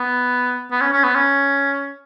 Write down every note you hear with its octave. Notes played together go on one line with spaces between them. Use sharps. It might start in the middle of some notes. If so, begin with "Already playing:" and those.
Already playing: B3
B3
C#4
C#4
B3
C#4